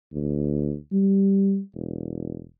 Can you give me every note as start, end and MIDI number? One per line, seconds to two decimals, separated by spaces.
0.13 0.76 38
0.92 1.60 55
1.74 2.44 28